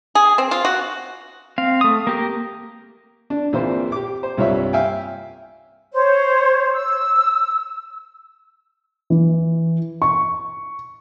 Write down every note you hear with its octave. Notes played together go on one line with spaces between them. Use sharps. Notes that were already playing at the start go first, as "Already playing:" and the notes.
G#4
C4
F4
F#4
C4 F5
A3 D#6
A#3 G4 A#4
D4
A#1 A#2 E3 C4 F4 C5
G4 D6
C5
C2 G2 F4 C#5 E5
E5 F5 G5 G#5
C5 C#5
E6
E3
C#6